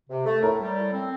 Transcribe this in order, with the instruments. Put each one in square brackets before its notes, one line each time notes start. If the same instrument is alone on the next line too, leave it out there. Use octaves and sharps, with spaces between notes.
[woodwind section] C3
A3
[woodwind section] A2 [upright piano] A#4
[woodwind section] G3
A2
C4